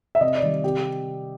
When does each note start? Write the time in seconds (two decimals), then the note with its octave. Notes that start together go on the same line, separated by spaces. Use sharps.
0.15 E5
0.21 C3 D#5
0.35 D5
0.42 D#3 G3
0.64 C3 G4